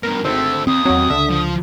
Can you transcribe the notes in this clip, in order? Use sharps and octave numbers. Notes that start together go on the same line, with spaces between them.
G2 B2 A#4
G#1 D3 A3 C4 E6
D#2 C4 D#6
E2 F#3 C4
C#2 D3 E5
F3